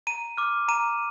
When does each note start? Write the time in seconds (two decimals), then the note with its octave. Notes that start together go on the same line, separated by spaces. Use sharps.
0.07 A#5 D#7
0.38 D6 F6
0.68 A#5 D#7